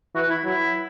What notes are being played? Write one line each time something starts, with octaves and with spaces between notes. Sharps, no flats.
E3 F#4
E4
F#3 E4